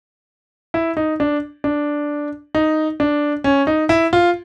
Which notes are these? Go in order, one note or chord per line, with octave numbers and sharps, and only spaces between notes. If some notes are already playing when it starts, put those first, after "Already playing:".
E4
D#4
D4
D4
D#4
D4
C#4
D#4
E4
F4